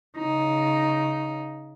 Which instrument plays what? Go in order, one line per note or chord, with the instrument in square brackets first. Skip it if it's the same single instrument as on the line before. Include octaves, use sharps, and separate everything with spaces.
[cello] C#3 D#4